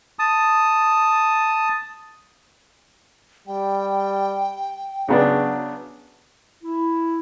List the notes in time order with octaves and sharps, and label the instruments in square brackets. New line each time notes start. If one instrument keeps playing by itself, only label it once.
[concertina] A5 D#6
[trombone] G3 [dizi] G5
[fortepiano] C#3 B3 D4 [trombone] F#3
[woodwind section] E4